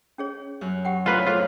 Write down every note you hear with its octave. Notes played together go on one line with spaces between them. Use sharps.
C#4 G#4 C#5
F#2 F#6
G4 F#5 G5
A2 F4 A#4 B4 C#5 D5 A#5 C6
F4 G#4 A4 C5 C6